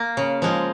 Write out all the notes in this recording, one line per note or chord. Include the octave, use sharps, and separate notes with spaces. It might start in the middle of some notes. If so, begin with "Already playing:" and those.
Already playing: A#3
C#3
F3 G#3